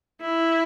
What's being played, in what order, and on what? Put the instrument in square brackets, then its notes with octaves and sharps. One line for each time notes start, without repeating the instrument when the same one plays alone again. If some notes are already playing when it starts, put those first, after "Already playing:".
[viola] E4